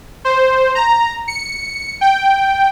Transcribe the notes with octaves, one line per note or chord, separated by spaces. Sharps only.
C5
A#5
C#7
G5